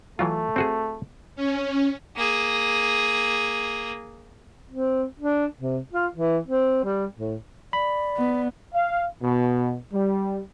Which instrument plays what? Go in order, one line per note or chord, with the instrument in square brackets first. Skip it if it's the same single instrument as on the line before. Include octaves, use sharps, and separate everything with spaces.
[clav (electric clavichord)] E3 F#3 F4 [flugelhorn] A3
[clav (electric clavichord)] C4 F#4 G#4
[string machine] C#4
[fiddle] A#3 G#4
[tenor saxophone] C4
D4
C3
F4
E3
C4
G3
A2
[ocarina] D5 [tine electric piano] B5
[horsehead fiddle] B3
[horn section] F5
B2
G3